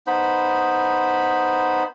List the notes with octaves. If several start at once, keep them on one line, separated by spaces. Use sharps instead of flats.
B3 D#4 C5 B5